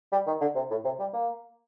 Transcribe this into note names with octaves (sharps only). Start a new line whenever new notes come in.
G3
D#3
D3
C3
A2
C3
G3
A#3